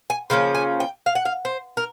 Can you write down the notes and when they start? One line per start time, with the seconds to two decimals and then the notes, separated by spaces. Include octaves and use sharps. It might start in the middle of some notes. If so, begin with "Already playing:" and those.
0.10 G#5
0.30 C#3 F3 A#3 C#4
0.55 G#5
0.80 G5
1.06 F5
1.15 F#5
1.25 F5
1.45 C5
1.77 A#4